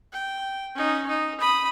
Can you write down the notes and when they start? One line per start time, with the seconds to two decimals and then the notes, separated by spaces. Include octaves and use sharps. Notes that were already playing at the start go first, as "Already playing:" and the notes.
0.13 G5
0.75 C#4 D#4
1.08 D#4
1.40 B5 D#6